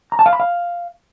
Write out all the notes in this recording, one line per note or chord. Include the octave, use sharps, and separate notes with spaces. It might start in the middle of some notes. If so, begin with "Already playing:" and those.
A#5
A5
F5
B5
F5